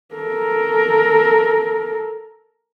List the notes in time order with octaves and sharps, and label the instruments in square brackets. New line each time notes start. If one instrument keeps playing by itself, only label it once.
[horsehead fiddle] A4 A#4